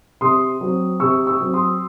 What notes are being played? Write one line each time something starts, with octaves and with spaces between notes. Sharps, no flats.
C3 C6 D#6
F#3 C4
C3 C#6 E6
C#6 E6
F#3 C4
C6 D#6